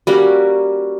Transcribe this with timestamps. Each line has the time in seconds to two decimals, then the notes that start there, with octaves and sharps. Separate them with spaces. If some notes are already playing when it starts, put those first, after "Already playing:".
0.07 G3 A#3 C#4 F#4